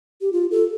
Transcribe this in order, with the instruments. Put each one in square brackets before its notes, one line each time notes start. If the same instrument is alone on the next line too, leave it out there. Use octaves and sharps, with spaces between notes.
[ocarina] G4
F4
A4